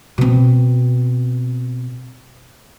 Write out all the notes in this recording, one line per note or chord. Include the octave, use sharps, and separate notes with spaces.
B2 C4